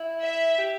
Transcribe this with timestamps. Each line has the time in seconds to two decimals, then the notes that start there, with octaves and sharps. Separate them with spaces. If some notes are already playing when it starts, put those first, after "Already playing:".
Already playing: E4
0.21 E5
0.58 G4